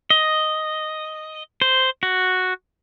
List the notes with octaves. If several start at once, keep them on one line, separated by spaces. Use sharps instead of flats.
D#5
C5
F#4